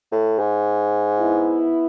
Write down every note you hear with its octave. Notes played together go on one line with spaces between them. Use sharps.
A2
G#2
B3 E4